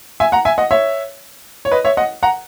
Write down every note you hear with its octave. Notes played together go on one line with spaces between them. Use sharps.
E5 G#5
F#5 A#5
E5 G#5
D#5 F#5
C#5 E5
C#5
B4 D#5
C#5 E5
D#5 F#5
F#5 A#5